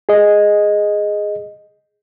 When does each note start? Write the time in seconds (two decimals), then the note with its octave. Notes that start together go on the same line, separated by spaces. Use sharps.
0.09 G#4 D#5